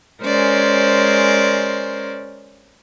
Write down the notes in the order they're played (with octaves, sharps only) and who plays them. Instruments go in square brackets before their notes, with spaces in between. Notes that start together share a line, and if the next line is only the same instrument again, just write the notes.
[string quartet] G#3 C#4 A#4 C5 D5